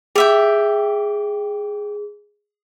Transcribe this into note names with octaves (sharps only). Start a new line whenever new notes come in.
G4 G#4 E5 G5